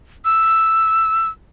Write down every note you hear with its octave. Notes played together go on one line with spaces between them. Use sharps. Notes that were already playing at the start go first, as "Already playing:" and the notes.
E6